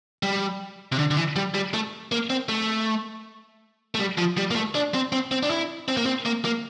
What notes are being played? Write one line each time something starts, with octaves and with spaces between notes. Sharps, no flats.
G3
C3
D3
D3
E3
G3
G3
A3
A#3
C4
A3
A3
G3
F3
G3
A#3
A3
D4
C4
C4
C4
D4
E4
C4
A#3
C4
A#3
A#3